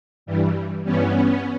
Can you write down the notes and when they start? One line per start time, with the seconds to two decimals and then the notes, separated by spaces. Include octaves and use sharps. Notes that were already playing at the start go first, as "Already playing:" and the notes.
0.26 G2 E3 G3
0.84 G2 E3 G3 B3 C#4